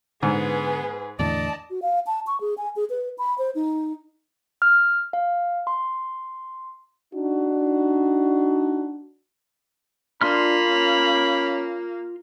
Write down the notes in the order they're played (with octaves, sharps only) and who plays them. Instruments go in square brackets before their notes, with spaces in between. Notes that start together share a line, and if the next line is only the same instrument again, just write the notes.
[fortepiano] G#2 [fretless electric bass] D3 [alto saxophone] B3 [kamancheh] G#4 B4
[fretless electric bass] E2 A2 D3 [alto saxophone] D5 [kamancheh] D#5 A5
[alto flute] F#4
F5
A5
C#6
G#4
G#5
G#4
B4
B5
C5
D#4
[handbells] F6
F5
C6
[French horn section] D4 D#4 F#4
[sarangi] A#3 [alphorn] D4 [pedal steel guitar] F4 C6 F6 [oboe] B5
[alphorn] C#4